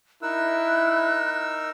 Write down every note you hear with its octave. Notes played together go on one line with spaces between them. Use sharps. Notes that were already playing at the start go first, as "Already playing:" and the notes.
D#4 E4 A#4 E6 F#6